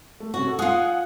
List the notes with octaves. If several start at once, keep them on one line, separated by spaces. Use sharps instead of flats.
A3
C3 C#4 F#4
A4
F4 G#4 F#5 D#6 F#6